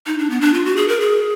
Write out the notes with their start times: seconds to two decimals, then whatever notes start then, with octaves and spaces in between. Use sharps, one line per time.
0.07 D#4
0.19 D4
0.30 B3
0.41 D4
0.54 F4
0.65 F#4
0.76 G#4
0.88 A#4
1.00 G#4